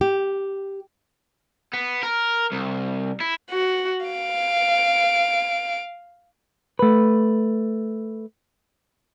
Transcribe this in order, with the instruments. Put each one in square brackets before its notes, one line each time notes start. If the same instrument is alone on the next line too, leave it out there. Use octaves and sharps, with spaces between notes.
[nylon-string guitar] G4
[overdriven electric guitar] B3
A#4
C2
E4
[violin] F#4
F5 D7
[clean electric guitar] A3 B4